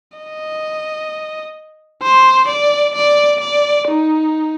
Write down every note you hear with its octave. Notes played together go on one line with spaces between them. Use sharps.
D#5
C5
D5
D5
D5
D#4